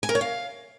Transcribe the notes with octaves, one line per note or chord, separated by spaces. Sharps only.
G#5
A#4
C#5
F5